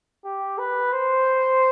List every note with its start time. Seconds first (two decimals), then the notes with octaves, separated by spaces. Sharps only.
0.25 G4
0.58 B4
0.92 C5